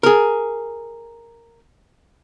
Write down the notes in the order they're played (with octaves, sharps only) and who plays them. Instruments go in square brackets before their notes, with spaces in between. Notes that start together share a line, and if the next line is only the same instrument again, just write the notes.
[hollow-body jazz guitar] G#4 A#4